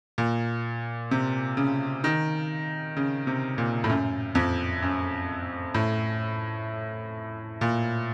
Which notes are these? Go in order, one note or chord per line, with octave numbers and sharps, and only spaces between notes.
A#2
C3
C#3
D#3
C#3
C3
A#2
A2
F#2
F2
F#2
A2
A#2